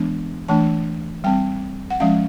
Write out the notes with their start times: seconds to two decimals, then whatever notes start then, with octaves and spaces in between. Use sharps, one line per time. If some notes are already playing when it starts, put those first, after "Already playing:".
Already playing: E3 G#3 B3 D4
0.48 E3 A3 D4 A5
1.24 G3 C4 G5
1.90 F#5
2.00 F3 G#3 C#4 F5